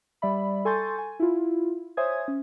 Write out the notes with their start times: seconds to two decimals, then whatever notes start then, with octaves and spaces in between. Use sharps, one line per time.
0.22 G3 D5 E5 B5
0.65 A4 G#5 C6 C#6 G6 A6
0.98 G#5
1.20 E4 F4
1.97 C5 C#5 E5 G#5 D#6 G#6
2.28 C#4